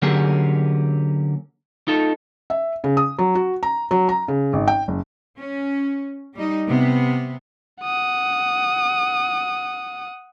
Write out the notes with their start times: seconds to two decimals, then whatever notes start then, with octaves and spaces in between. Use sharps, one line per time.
0.02 D3 F#3 A#3 C#4 G4 G#4
1.88 D#4 F4 A4
2.50 E5
2.84 C#3
2.97 D#6
3.19 F#3
3.35 F#4
3.63 A#5
3.91 F#3
4.09 A#5
4.28 C#3
4.53 G#1
4.68 G5
4.88 F#1
5.37 C#4
6.34 G3 D#4
6.66 C3 B3
7.82 F#5 D#6